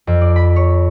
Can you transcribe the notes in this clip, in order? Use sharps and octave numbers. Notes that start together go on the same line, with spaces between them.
F2
D5
B5
C#5